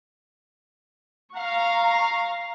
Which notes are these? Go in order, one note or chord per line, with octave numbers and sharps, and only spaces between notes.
F5 A#5 C#6